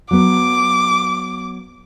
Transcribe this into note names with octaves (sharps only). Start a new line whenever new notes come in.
F#3 B3 D6